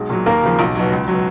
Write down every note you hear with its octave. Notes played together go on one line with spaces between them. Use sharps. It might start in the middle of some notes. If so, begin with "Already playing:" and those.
Already playing: B1 G#3 G#4
A#2 F#3
D#2 A#3 A#4
C#3 F3
B1
B2 F#3
C#2
B2 F#3